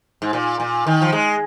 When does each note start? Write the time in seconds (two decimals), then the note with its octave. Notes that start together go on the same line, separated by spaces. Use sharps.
0.22 G#2
0.33 A#2
0.60 A#2
0.87 D#3
1.01 F3
1.12 G#3